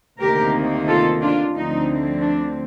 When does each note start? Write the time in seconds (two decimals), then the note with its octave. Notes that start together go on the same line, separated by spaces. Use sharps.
0.21 D2 C3 D#3 A#3 G4 A#4
0.88 F4 A4
1.21 D4 F4
1.55 D2 D3 F3 A3 C4 D#4
2.22 D4